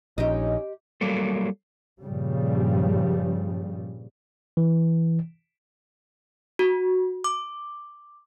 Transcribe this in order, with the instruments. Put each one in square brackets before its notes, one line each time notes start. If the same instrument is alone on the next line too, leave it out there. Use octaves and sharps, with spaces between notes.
[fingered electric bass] A#1 [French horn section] C#4 D#4 [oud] G4 C5 D#5
[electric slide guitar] F#3 G3 A#3 A4
[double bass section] G2 A#2 C#3 F3 G3
[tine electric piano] E3
[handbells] F#4
D6